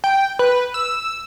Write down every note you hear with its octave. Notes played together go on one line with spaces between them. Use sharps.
G5
B4
E6